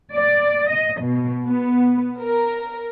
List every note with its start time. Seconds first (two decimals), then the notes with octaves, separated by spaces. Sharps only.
0.14 D5
0.70 D#5
1.02 B2
1.47 B3
2.20 A#4